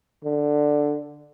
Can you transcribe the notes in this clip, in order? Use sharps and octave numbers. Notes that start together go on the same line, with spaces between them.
D3